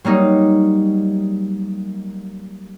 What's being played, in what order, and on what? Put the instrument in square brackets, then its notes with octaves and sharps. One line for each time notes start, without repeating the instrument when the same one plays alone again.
[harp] F#3 G3 A#3 D#4